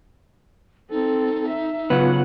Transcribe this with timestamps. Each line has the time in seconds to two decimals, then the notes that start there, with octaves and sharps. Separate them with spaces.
0.91 C4 D#4 A4
1.49 E5
1.90 C#3 F#3 B3 F4 B4 F#5